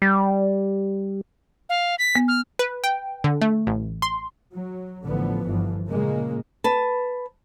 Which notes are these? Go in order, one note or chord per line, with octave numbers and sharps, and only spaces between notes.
G3
F5
B6
B3
F6
B4
G5
D3
A3
A1
C6
F#3
A1 D3 F3 B3
G1 E3 F3
A#2 C#3 G#3 A#3
B4 A5